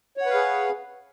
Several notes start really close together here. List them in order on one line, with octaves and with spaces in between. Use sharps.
C#5 F#5 B4 F5 G#4